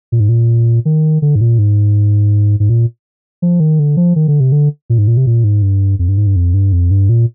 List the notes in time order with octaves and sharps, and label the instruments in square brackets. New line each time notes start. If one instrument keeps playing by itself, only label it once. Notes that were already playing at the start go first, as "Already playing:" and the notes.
[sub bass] A#2
G#2
A#2
D#3
D3
G#2
A#2
G#2
G#2
A#2
F3
D#3
D3
F3
D#3
D3
C3
D3
A#2
G#2
A#2
C3
A#2
G#2
G2
F2
G2
G#2
G2
F2
G2
F2
G2
A#2